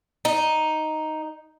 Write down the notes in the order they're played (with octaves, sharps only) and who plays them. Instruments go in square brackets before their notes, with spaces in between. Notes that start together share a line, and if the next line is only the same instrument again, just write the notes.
[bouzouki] D#4